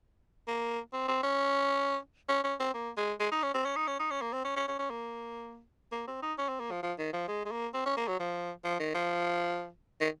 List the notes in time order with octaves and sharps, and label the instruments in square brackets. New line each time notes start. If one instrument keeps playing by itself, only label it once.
[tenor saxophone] A#3
C4
C4
C#4
C#4
C#4
C4
A#3
G#3
G#3
D#4
C#4
C4
C#4
D#4
C#4
D#4
C#4
A#3
C4
C#4
C#4
C#4
C#4
A#3
A#3
C4
D#4
C#4
C4
A#3
F3
F3
D#3
F3
G#3
G#3
A#3
C4
C#4
A#3
F#3
F3
F3
D#3
F3
D#3